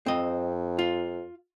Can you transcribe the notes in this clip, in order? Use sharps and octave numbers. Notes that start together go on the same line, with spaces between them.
F2 C4 D#5
F4